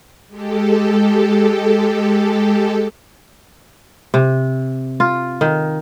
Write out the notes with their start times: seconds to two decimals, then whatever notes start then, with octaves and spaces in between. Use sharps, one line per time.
0.28 G#3 G4 A4
4.14 C3
5.00 F4
5.41 D#3